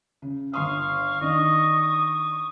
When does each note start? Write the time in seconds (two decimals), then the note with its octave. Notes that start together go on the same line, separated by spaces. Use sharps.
0.22 C#3
0.54 G1 F5 C6 C#6 D#6
1.21 D#3 D4 D#5
1.82 D#6